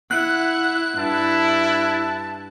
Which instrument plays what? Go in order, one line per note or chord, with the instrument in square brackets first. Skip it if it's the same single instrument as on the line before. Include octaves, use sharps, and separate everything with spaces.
[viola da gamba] E4 [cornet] F#5 [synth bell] F#6
[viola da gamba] G2 [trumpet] E4 [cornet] A5